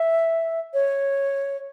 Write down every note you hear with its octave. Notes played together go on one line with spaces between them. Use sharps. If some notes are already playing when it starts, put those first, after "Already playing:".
Already playing: E5
C#5